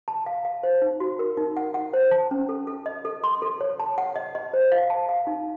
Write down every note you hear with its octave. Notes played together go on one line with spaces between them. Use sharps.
A5
F5
F5
C5
D#4
F#4
A#4
D#4
F#5
F#5
C5
A5
C#4
A4
A4
D#5
A4
C6
A4
C#5
A5
F#5
D#5
D#5
C5
F5
A5
F5
D#4